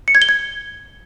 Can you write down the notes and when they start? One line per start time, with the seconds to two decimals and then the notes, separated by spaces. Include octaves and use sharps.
0.08 C#7
0.15 G#6
0.22 G7
0.29 G#6